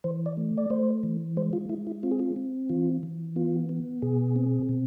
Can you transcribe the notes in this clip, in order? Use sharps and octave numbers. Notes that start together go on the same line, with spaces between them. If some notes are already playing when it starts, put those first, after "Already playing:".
E3 C5
D5
A3
D5
A3 C5
E3
G#3 C5
F4
G#3 E4
E4
C4 F4
G#4
F4
C4
E3 F4
E3
B3 F4
B3
B2 G#4
C4
B2